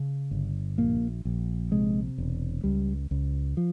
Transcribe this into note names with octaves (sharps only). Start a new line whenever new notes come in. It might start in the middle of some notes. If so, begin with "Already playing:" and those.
Already playing: C#3
G1
A#1 A#3
A#1
C3 G#3
E1
C#2 G3
C#2
F3